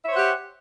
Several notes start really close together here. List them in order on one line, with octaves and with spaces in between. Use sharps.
E5 C#5 C5 F#5 G4